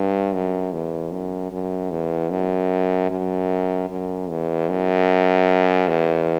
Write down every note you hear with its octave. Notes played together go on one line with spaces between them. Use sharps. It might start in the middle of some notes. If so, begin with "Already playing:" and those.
Already playing: G2
F#2
E2
F#2
F#2
E2
F#2
F#2
F#2
E2
F#2
E2